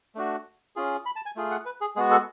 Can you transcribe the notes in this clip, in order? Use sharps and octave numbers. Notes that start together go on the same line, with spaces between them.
A3 D4 F#4
C#4 F4 G#4
B5
A5
G#5
A3 F4 G#4
F#5
B4
G#4
G#3 B3 F#4 G#4
A4